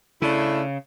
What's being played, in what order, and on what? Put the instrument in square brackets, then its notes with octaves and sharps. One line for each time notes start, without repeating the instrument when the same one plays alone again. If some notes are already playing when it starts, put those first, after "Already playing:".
[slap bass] C#3 [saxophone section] A3 D4 E4